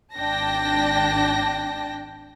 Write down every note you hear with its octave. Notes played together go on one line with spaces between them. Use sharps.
G#1 D4 G5 A5 A#6